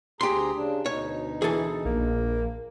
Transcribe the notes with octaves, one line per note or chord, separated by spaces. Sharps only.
D2 G4 G#4 A#5 C6
C#3 D4
D2 B2 D#4 C#5
E3 G#4 A4
A#1 A#3